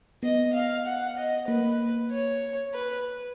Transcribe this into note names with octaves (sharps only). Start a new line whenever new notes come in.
B3 D#5
F5
F#5
D#5
A#3 B4
C#5
B4